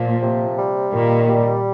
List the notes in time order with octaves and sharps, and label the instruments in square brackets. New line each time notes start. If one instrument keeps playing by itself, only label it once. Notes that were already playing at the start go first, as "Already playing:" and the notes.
Already playing: [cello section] A#2 [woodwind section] F3
[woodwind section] C3
G3
[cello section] A#2 [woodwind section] D#3
[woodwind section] G3